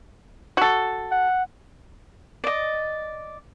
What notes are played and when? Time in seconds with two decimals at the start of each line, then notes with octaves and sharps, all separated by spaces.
0.57 F#4 A4
1.11 F#5
2.44 D5 D#5